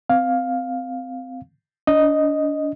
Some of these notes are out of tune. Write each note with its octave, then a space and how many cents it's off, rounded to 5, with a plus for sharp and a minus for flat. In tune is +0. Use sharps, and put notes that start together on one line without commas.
C4 -20 F5 +10
D4 -35 D#5 +0